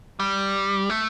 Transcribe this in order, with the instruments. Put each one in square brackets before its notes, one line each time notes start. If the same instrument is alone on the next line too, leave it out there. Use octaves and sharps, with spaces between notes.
[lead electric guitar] G3
A3